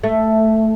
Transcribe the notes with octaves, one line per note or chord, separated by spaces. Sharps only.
A3